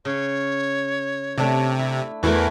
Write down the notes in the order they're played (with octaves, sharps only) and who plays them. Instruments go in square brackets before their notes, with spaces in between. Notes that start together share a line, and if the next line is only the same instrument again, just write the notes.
[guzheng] C#3 [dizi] C#5
[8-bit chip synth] C3 [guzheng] A3 D4 D5
[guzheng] E4
[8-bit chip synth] E2 E3 [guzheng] A3 E4 F#4 [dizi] A#4